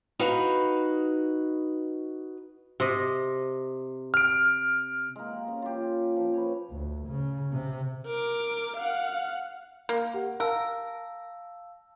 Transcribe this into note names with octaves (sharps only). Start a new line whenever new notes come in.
D#4 F#4 B4 F5
C3 D#5
F6 D7
G#3 A#3
G4
C#4
F4 G4
F3
B4 C#5
D2
C#3
C3
A#4 D6
F5 F#5
A#3 F6
G4 F#5
A#4 F5 A5 E6